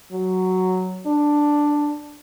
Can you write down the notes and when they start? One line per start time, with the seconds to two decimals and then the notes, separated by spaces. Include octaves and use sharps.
0.12 F#3
1.06 D4